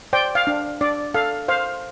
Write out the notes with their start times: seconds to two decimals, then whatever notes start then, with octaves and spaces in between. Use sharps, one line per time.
0.13 C5 D5 G5
0.35 F5
0.47 D4
0.81 D4 D5
1.14 A4 F5
1.48 C5 F5